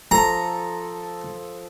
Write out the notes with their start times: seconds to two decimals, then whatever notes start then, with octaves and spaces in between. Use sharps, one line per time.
0.11 F3 A4 A#5 D#6